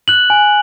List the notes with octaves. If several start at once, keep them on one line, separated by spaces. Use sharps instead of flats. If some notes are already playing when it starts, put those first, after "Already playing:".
F#6 F#7
G#5